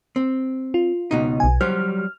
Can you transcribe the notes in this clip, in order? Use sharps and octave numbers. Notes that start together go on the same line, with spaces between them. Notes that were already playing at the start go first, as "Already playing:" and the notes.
C4
F4
C#2 B2 D#4
B1 G#5
F#3 G3 C5 F6